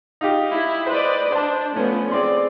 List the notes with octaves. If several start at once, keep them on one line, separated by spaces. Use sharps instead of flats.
D#4 F4 G4
E4
B4 C5 D5 D#5
D4 C5 A5
F3 A3 B3 C#4
C4 G#4 D5 C6